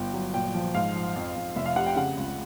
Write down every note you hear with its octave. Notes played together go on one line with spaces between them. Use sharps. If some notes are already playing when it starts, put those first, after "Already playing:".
Already playing: G1 G5
F#3
A#2 G5
F3
G#2 F5
F3
F2
F2
F1 E5
F5
C3 F#5
G5
C#3 F#5
C#2